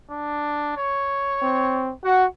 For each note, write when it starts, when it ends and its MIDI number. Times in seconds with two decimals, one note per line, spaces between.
0.11 0.74 62
0.77 1.92 73
1.42 1.93 60
2.04 2.26 66
2.04 2.23 78